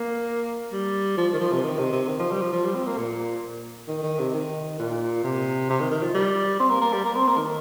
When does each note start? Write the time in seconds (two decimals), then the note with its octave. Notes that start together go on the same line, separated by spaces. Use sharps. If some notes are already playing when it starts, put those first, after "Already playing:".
Already playing: A#3
0.72 G3
1.17 F3
1.33 D#3
1.40 F3
1.52 C3
1.64 D#3
1.78 C3
1.92 C3
2.08 D#3
2.19 F3
2.31 G3
2.41 F3
2.53 F3
2.65 G3
2.75 C4
2.87 A#3
2.98 A#2
3.88 D#3
4.03 D#3
4.19 C3
4.34 D#3
4.79 A#2
5.24 C3
5.70 C3
5.80 D#3
5.91 D#3
6.03 F3
6.14 G3
6.60 C4
6.70 A#3
6.81 A#3
6.93 G3
7.05 A#3
7.16 C4
7.27 A#3
7.37 D#3